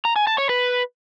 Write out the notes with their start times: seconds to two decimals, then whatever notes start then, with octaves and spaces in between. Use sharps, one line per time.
0.05 A#5
0.16 G#5
0.27 A5
0.38 C#5
0.49 B4